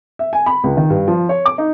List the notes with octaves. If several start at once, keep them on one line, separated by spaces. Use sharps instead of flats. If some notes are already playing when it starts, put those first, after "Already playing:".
E5
G#5
B5
C#2
D#3
G2
F3
C#5
D6
D#4